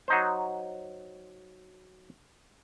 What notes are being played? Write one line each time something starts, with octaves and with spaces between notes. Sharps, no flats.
F#3 D#4 C5